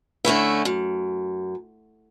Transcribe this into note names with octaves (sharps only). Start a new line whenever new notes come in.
D3 A3 C#4 E4
F#2